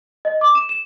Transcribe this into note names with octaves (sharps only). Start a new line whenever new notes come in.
D#5
D6
E7
E7